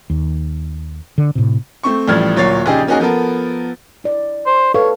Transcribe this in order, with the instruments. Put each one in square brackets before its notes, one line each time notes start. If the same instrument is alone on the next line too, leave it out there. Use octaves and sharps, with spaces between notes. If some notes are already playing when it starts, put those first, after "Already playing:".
[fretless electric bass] D#2
D3
A2 C3
[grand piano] A3 C4 C#6
A1 A2 F3 G3 F6 G#6
D1 A#2 F#3 C#5 A6 C7
A#1 C#3 D#4 G4 G#4
A#3 C#4 D#4 F#4 G#4 A#4
F3 B3 A4 A#4
[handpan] E4 D5
[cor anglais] C5
[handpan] A4 B4 F5 [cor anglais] C#5